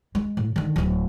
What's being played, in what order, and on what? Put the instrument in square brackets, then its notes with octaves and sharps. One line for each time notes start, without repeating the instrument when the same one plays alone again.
[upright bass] G#3
A2
D3 D#3
D1 B3